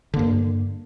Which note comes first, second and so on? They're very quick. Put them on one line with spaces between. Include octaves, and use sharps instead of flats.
D3 A#3 G2